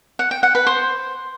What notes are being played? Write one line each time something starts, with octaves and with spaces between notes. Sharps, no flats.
F#5
G5
F#5
B4
C5